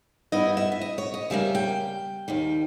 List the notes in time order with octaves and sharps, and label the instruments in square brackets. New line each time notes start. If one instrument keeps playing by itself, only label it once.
[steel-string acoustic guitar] G2 G3 B3 E4 D#5
E5
E5
D#5
C#5
D#5
C#3 G3 A#3 E5
G5
D#2 D#3 G3